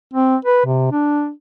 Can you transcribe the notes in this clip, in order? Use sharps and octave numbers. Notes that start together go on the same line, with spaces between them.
C4
B4
C3
D4